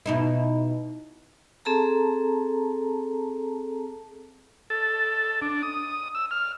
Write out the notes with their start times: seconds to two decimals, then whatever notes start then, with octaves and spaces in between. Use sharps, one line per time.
0.06 B2 D#4 E4
1.65 C4 G#4 A4 A5 A#5
4.70 A4
5.42 D4
5.63 D#6
6.15 E6
6.31 F6